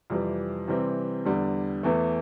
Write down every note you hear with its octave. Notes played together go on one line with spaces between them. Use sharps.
F2 C3 E3 G3
C3 E3 G3 C4
E2 D3 G3
E2 E3 A3